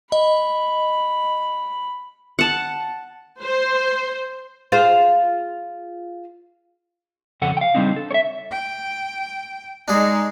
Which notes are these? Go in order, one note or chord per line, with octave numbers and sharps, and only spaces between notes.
D#5 B5
F#5 A5
C5
F4 G#4 C5
F2 C#3 A4 F#5
F5 G5
C#3 F3 G3 C4 D4 D#4
A4
C#5 E5
G5
G#3 D4 D#4 G#4